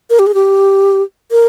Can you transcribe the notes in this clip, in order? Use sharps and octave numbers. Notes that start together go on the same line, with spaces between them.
A#4
G4
G#4
G4
A#4